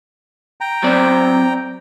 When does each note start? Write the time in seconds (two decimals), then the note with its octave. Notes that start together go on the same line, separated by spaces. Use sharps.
0.61 G5 A#5
0.83 F#3 C4 D5